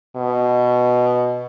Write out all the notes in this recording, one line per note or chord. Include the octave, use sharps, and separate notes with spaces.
B2